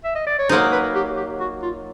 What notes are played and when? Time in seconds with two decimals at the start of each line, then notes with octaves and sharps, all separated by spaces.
0.04 E5
0.15 D#5
0.27 D5
0.39 C#5
0.49 F#3 A#3 D#4 C5
0.72 B4
0.95 G4
1.17 G4
1.40 F#4
1.63 F4